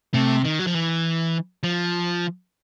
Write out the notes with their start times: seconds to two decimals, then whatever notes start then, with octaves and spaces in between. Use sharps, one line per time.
0.14 C3 A3
0.45 D#3
0.59 F#3
0.67 F3
0.74 E3
1.63 F3